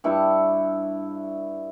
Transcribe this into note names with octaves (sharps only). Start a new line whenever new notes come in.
G2 E4 C#5